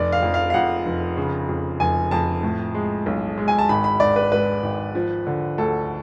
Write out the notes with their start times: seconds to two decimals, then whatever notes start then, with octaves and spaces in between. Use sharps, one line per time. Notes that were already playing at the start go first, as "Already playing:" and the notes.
Already playing: F1 D5
0.12 F5
0.23 F2
0.34 F5
0.50 F5
0.54 F2 F#5
0.86 F1
1.17 C#3
1.49 F2
1.80 F1 G#5
2.11 F2 A5
2.43 A2
2.74 G#3
3.06 B1
3.38 G#3
3.48 G#5
3.59 A5
3.69 G#1 B5
3.84 B5
4.00 G#1 D5
4.16 B4
4.32 G#2 B4
4.63 G#1
4.95 F3
5.27 D3
5.58 D2 A4